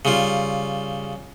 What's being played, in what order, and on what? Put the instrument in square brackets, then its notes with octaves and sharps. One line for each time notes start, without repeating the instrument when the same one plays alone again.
[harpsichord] C#3 G3 F4